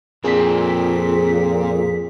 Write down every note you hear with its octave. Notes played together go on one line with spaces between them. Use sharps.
F2 A#2 C4 D4 G#4 B6